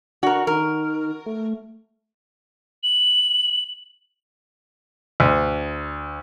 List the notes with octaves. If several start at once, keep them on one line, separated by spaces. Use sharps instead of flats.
D4 F#4 A#4
D#3 A#4
A3
F#7
D2